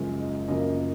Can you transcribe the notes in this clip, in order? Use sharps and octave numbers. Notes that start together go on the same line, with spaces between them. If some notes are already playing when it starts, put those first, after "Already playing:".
Already playing: F#1 F#2 F3 G#3
D#5
F#2 C#3 F3 A#3 D#5